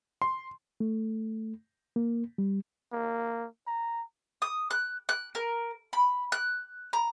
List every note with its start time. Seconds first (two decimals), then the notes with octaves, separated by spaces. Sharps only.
0.22 C6
0.80 A3
1.96 A#3
2.38 G3
2.92 A#3
3.67 A#5
4.42 D#6
4.71 F#6
5.09 F#6
5.35 A#4
5.93 B5
6.32 F#6
6.93 A#5